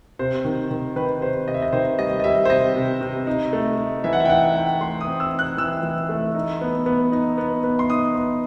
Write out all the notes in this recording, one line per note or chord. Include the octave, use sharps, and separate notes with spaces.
C3 C5
D#3
D#3
D#3 B4
C3 C5
C3 D#5
E5
D#5
D#3 C5
G3 D#5
D#5
G3 E5
C5
C3 D#5
C3
C3
D#4
A3
D#4
E3 E5
F#5
E5
G5
D#4 F#5
D#4 G5
A3 C6
D#6
C4
E6
D#4
F#6
E3 E6
E3
A3
D#4
B3
B3
D#4
B3
B3
C6
D#4 D#6
B3